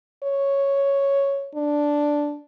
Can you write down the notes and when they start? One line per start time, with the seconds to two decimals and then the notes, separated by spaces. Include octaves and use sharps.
0.23 C#5
1.55 D4